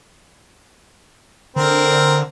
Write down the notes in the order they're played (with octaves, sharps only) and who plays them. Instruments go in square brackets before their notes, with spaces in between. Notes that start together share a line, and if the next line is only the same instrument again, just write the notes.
[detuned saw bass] D3 [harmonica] C4 A#4